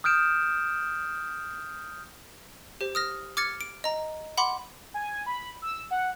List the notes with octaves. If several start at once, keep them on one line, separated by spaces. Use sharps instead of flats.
D#6 F6 G6 D7 E7
G4 C5
D#6 F6 A#6
D6 F6 G#6 A6 C#7
D7
D#5 A#5
F#5 B5 C6 D6
G#5
B5
E6
F#5